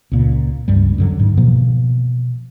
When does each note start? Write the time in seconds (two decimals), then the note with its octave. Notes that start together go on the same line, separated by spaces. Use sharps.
0.12 C#2 A#2
0.68 C#2 G2 G3
0.98 F#2 D3 F#3
1.19 G#2
1.37 B2 E3 F3 A#3